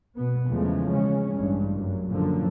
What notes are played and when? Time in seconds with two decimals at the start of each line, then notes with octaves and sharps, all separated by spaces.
0.16 B2 B3
0.49 E2 C#3 F3 G#3 A3
0.92 C#3 G#3 C#4
1.35 A1 G2
1.77 F#2
2.10 F#2 A#2 D3 F3